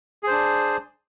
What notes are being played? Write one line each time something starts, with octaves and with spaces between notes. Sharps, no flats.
D4 G#4 C5